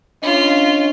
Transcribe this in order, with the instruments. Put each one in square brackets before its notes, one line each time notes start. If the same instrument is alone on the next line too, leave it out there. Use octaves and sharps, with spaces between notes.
[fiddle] C#4 F4 [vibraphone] D4 D#5